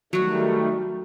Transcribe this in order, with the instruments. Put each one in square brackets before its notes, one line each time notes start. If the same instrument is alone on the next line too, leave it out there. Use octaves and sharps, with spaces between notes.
[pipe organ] D#3 G3 A3 [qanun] F#3 F#4